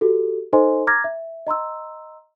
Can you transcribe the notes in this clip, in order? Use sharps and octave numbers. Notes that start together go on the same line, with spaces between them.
F#4 G4 A4
D#4 A4 C5 D#5 G#5 C6
A#5 D6 F6 G#6 A#6
E5
D#5 A#5 C6 E6